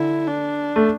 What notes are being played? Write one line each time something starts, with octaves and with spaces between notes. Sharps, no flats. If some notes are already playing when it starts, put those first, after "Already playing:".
Already playing: D3 E4
D4
A3